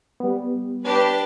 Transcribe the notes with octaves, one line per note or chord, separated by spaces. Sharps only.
G3 B3
D4 G4 B4